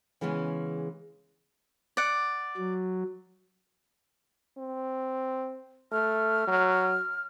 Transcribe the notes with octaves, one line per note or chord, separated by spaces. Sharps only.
C#3 E3 G#3 B3 C#4
D5 F#5
F#3
C4
A3 F6
F#3